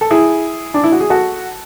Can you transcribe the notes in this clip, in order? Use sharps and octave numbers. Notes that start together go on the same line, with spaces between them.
A4
E4 G#4
D4
E4
F#4
G#4
F#4 A4